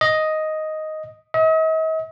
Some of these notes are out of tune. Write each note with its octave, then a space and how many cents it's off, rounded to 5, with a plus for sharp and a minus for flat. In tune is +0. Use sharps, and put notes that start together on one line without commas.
D#5 +5
D#5 +45